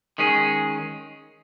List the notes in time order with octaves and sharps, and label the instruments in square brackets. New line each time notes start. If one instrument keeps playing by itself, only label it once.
[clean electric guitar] D#3 G#3 C#4 G#4